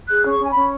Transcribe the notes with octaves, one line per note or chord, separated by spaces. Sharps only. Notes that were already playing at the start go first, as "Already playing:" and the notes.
G#4 F#6
C#4
C#6
C#4 G#5
B5
C#4